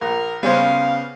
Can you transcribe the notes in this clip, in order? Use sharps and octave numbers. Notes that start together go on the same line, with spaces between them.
A#1 A#4
C#3 G3 B3 C#4 C5 F5